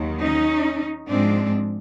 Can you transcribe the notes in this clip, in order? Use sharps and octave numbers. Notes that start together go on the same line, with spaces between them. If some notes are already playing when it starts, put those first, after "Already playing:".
Already playing: D#2 D#3 F#3
C#4 D#4
G#2 F3 G#3 C4 D4